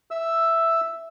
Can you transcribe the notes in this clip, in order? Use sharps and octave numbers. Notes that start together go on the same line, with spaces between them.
E5 E6